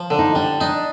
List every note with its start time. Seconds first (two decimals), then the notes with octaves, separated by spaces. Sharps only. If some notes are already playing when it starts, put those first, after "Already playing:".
Already playing: F3
0.10 D3
0.19 D#4
0.35 G3 D4
0.61 D4 D#4